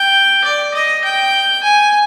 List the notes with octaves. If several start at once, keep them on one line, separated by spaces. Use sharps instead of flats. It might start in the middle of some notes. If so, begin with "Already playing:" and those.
Already playing: G5
D5
D#5
G5
G#5